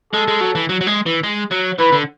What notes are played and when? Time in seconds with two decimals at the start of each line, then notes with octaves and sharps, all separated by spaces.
0.13 G#3 A4
0.28 G#3
0.41 F#3
0.55 E3
0.69 F#3
0.81 F#3
0.87 G#3
1.06 E3
1.24 G#3
1.52 F#3
1.79 E3 B4
1.93 D3